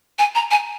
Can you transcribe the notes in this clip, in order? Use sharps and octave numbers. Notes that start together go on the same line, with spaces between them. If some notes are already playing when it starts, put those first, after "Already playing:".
G#5
A#5
G#5